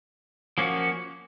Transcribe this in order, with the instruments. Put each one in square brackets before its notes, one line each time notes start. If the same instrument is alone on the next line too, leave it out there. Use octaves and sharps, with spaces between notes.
[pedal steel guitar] F3 A#3 C#4 F#4